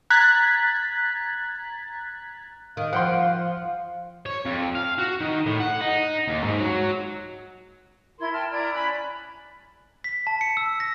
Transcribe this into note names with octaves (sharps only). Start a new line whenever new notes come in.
A#5 F#6 G#6 A6 B6
D#3 F5
F3 F#5 G5 C6
C#5
F2
F5
F#4
D#3
A2
F#5
D#4
D#2
G#2
F#3
E4 A#4 C6 G#6
G5 A5 C6 F6
E4 D5 A#5 G#6
C#4 B5 F#6
B6
A5
C#7
E6
A#6